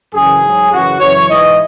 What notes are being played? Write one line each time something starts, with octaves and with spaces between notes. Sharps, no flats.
F#2 C#3 E3 G#4
G#2 F#3
F#2 C#3 E3 F#4
F#2 C#3 E3 C#5
G#2 E3 D#5